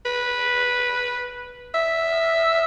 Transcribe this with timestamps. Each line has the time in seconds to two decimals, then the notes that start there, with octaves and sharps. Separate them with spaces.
0.06 B4
1.74 E5